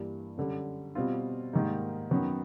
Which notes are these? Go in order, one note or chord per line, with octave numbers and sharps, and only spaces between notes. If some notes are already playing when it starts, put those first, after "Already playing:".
Already playing: G2 E3 G3 A#3
F#2 D3 G3
B2 G3 C4 F4
G#2 D#3 G3 A#3 D#4
F#2 D#3 F#3 B3